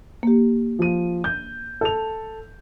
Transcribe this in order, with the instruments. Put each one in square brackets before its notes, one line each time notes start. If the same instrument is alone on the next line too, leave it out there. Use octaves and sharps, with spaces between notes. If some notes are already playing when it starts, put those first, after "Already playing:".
[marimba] A#3 G4
[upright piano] F3 D#7
G6
A4 F7